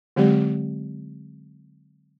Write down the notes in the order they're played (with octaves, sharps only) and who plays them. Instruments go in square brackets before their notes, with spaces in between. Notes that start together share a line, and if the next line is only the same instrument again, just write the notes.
[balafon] D3 F#3 G#3 C4 G4 D5